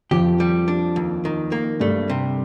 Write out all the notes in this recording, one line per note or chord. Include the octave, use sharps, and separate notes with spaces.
F2 F3 G4
G3
D4
D#2
D#3
A#3
G2 G3 A3
C3